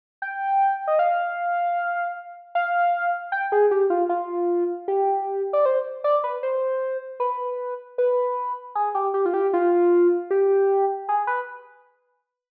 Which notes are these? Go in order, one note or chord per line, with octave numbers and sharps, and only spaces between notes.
G5
D#5
F5
F5
G5
G#4
G4
F4
F4
G4
D5
C5
D5
B4
C5
B4
B4
G#4
G4
G4
F4
G4
F4
G4
G#4
B4